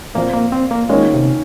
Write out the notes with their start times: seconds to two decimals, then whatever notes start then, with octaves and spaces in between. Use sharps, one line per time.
0.15 A#2 F3 A#3 C4 F4
0.33 A#3
0.52 C4
0.71 A#3
0.89 D#3 G#3 A#3 C#4 F4
1.14 C3